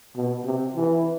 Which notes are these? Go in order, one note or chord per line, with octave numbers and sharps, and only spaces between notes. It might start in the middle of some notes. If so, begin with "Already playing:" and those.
B2
C3
E3